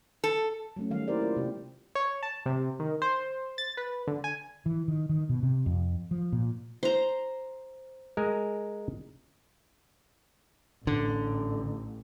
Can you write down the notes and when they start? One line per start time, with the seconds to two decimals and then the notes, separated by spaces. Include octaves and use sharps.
0.24 A4
0.77 F#3 A3 C#4
0.90 D#3 G3 F5
1.08 A#3 E4 G4 A#4 C5 D5
1.21 F4
1.37 C3 G4
1.95 C#5
2.23 A5
2.46 C3
2.80 D#3
3.02 C5
3.58 A6
3.77 B4
4.07 D3
4.24 G#5
4.66 E3
4.88 D#3
5.09 D#3
5.29 B2
5.43 C3
5.66 F2
6.11 F3
6.32 A#2
6.83 C5 A#5
8.17 G#3 A#4 G#5
10.87 A1 D3